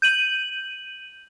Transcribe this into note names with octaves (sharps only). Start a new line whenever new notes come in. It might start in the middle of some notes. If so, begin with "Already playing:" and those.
G6 D#7 F#7